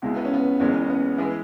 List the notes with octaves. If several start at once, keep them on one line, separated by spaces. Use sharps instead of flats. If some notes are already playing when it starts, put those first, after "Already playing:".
C#2 B2 G#3 E4
B3
C#4
B3
F#1 E2 E3 G#3 C#4
C#4
B3
E3 G#3 B3 E4 G#4